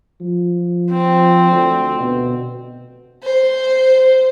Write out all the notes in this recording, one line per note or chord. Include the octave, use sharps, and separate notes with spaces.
F3
C4
D2
B2
C5